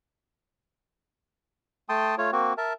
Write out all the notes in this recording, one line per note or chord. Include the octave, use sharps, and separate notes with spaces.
A3 G5 A5 C6 D#6
A3 F4 C#5
A#3 C4 F#4
A#4 E5 A5